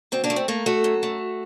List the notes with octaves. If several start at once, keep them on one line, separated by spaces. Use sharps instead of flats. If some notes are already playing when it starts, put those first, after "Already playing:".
D2 C4
A#3 D4
A3
C4
A3 A#3
A3 F#4 A4
F#2
A3